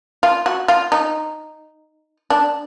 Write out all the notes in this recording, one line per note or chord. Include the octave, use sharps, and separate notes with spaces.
F4
F#4
F4
D#4
D4